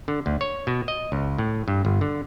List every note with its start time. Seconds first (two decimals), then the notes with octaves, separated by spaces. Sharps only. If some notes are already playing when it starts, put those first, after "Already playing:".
0.08 D3
0.26 D2
0.41 C#5
0.67 B2
0.88 D#5
1.12 C#2
1.38 A2
1.68 G2
1.85 G1
2.01 D3